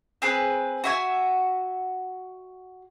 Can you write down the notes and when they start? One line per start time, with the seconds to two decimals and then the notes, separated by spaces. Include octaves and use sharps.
0.22 C4 G#4 B4
0.84 F#4 E5 G#5